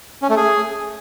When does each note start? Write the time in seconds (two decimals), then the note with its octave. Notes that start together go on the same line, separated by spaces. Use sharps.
0.22 C#4
0.30 A3
0.37 G#4